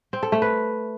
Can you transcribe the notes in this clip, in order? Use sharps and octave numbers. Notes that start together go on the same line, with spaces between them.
C4
A4
A3
B4